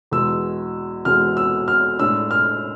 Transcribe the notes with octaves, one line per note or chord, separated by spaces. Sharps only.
E2 B2 G#3 E6
E2 B2 G#3 F6
E6
F6
A2 G#3 D4 E6
F6